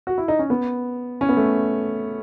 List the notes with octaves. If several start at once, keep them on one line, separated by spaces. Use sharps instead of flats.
F#4
E4
D#4
C#4
B3
C#4
B3
A3